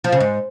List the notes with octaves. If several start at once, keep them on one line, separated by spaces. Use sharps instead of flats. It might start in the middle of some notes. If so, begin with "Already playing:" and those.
F3
C#3
G#2